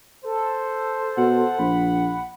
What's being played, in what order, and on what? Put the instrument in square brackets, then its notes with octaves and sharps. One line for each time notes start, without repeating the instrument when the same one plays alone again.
[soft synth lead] A4 [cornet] C5
[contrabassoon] B2 [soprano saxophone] F#5
[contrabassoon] A#1 [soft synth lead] B5